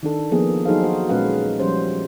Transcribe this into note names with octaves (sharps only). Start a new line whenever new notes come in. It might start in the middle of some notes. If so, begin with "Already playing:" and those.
D#3 D4 A4
F3 A#3 B3 G#4
F#3 D#4 G#4 A4 C5 F5
F#4 C5
A#2 G#3 C#4 B4 F5 F#5
F3 G3 C#4 C5